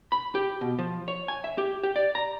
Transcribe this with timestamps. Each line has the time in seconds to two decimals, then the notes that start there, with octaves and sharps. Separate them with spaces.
0.12 B5
0.35 G4
0.61 B2
0.79 F3
1.08 C#5
1.28 G#5
1.44 E5
1.58 G4
1.83 G4
1.96 D5
2.15 A#5